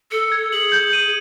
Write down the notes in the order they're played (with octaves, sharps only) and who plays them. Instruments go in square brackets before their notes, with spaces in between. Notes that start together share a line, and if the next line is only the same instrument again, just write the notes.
[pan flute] A4 [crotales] C#7
[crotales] G#6
[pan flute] G#4 [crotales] F#7
[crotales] G6
D#7